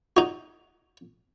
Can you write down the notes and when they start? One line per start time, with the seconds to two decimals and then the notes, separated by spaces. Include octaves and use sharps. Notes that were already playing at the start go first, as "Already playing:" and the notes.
0.17 D#4 F#4